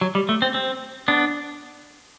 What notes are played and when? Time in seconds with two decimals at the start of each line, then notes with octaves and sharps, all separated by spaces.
0.01 F#3
0.15 G3
0.29 A3
0.42 C4
0.54 C4
1.08 B3 D4